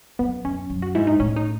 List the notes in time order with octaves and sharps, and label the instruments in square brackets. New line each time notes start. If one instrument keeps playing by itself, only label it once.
[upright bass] F#2 [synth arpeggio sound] B3
[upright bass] F#2 [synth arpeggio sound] C#4
[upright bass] F#2
[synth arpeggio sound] F#4
[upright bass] G#2 [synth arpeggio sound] E4
[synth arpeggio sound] D#4
[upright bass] A2 [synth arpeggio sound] C#4
[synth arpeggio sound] D#4